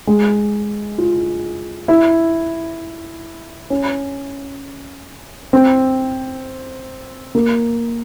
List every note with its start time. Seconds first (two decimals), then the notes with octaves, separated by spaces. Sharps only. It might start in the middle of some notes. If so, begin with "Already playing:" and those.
0.07 G#3
0.98 F4
1.88 E4
3.70 C#4
5.53 C4
7.35 A#3